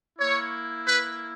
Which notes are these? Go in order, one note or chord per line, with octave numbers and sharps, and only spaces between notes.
A#3 E4 C#5
B4